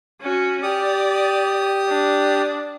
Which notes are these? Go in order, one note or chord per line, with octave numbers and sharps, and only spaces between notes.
C#4 F#4
G4 D5 D#6
D4